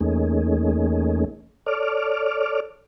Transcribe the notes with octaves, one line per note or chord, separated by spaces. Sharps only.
E2 A3 A#3 C#4 D#4 G#4
A4 C#5 D5 D6 F6